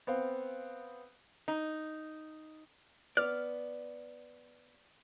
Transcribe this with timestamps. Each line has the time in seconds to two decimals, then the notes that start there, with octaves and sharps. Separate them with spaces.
0.07 B3 C4 F5
1.48 D#4
3.17 B3 D5 F6